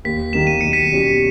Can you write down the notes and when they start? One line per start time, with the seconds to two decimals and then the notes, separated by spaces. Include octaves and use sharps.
0.05 D#2 B6
0.33 D#3 G3 A#3 E7
0.47 D#7
0.61 B1 C#7
0.73 B6 D#7
0.92 B2 G3 C#4 G4